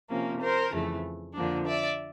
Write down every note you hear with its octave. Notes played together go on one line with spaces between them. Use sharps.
C3 F3 A#3 C#4
A#4 C5
F2 C#3 E3 A3
F2 D3 F3 A#3 D4
D5 E5